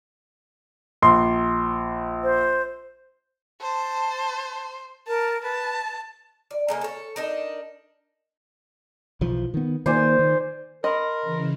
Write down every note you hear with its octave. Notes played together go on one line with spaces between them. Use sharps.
A#1 C6
C5
C5 A5
A#4 A5
B4 A5
D5
C#3 G#3 A#3
A4 C#5
D4 D#4 A#4
B1 E3 F3
D#3 B3
D#3 A#3 C5 D5 G#5
D#3
A#4 D#5 B5 C6
C#3 E3